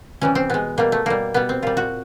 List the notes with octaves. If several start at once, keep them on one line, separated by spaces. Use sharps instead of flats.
C3 E3 G3 C#4
C4
B2 G#3 B3
B2 G3 A#3
A3
B2 G3 A#3
B2 G3 B3
C4
A#2 G3 F4
F#4